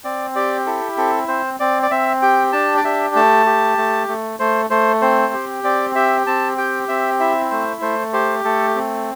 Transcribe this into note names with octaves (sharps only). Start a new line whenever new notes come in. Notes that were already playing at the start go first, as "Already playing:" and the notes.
C4 D5
G4 D5
E4 A4
C4 A4
C4 C5
C4 D5
D5
C4 E5
G4 G5
D4 A5
D5
G4 E5
A3 A5
G4
A3
A3
A3 C5
A3 C5
C4 C5
G4
C4 D5
G4 E5
C4 A5
G4 G5
C4 E5
E4 E5
A3 C5
A3 C5
G4 C5
A3 A4
C4